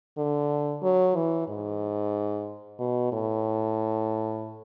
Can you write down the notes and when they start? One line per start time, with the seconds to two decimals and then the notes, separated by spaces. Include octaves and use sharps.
0.18 D3
0.83 F#3
1.16 E3
1.48 G#2
2.79 B2
3.12 A2